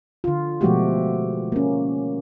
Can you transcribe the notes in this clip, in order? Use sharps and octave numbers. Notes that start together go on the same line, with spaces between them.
D3 F4
B2 F3 G#3 A3 F#4 G4
A#3 C#4